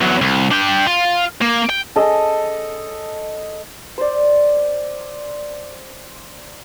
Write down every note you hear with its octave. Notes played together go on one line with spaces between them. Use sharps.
E2 F#3
C2
D4 G5
F4
A#3
G5
A4 D#5
C5 D5